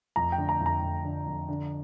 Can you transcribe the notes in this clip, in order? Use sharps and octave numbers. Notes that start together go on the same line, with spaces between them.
F2 A#5
G5
D3
A#5
F2
A#5
F2
D3
F2
D3